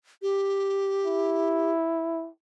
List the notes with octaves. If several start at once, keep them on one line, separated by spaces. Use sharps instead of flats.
G4
E4